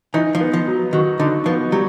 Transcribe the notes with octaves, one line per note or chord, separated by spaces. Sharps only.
E3 D#4
F3
B3
F3
F#3
D#3 F#4
D3 D#4
F3 B3
F#3 G3